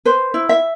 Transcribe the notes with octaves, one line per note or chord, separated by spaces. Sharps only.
B4 C5
E4
E5